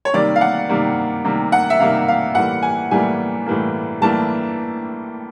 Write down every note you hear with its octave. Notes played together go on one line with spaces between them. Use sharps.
C#5
C3 D#3 G3 A#3 D5
F5
F#5
C3 D#3 G3 A#3
C3 D#3 G3 A#3
F#5
E5
C3 D#3 G3 A#3 F5
F5
A2 E3 G3 A#3 F#5
G#5
A2 E3 G3 A#3 G#5
A2 E3 G3 A#3
A2 E3 G3 A#3 A5